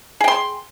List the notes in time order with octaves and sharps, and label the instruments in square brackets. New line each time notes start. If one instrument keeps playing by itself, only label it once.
[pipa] G#4
G5
C6